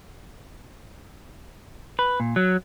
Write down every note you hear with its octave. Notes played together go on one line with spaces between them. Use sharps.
B4
A#2
F#3